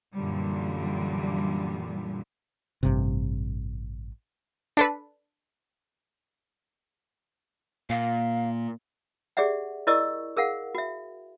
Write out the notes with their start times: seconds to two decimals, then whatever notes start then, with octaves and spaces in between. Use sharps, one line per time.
0.15 F#2 A#2 D3 E3 G3
2.83 A1 G2 C3
4.77 D4 A4 B4
7.90 A#2 F5
9.37 G4 G#4 D5 E5 F#5
9.87 E4 A#4 D5 D#5 C#6 E6
10.37 G#4 A#4 F5 F#5
10.75 F#4 E5